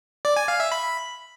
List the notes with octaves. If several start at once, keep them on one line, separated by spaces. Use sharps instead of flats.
D5
G#5
F5
E5
B5